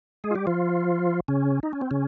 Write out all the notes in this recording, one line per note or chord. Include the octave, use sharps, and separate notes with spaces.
G#3 G#4
F4
G3 G4
F3 F4
C#3 C#4
D#4
C#4
C4
C#3 C#4